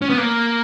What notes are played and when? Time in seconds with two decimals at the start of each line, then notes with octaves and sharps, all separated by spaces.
0.02 C#4
0.10 B3
0.18 A#3